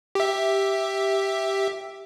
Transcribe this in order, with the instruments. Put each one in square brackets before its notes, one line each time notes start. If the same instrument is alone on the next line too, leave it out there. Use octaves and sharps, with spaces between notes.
[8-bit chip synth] G4 E5